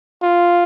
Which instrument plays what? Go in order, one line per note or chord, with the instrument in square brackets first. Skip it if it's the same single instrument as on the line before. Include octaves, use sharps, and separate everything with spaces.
[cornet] F4